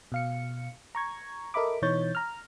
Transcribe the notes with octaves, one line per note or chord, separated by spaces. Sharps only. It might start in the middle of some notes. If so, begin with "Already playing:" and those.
B2 F5 C#7
A#5 C#6 G#6
A4 A#4 D#5 E5 B5 D6
B2 E3 D#4 C#5 G6 A6
A#5 F6